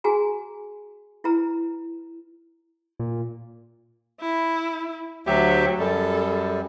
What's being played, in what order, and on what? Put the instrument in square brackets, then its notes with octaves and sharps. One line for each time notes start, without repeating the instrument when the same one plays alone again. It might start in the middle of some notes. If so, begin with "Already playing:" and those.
[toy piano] F#4 G#4 G#5 A#5
E4 B4 A#5
[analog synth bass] A#2
[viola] E4
[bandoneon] D2 G4 E5 [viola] F#3
[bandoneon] F#2 G3 [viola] A4